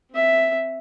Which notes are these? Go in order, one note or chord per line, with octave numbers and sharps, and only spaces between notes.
C4 E5